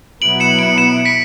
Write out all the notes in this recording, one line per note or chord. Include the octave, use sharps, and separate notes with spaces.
B2 F#3 B3 E4 D7 F#7
C#7 E7
D7 F#7
C#7 E7
B6 D7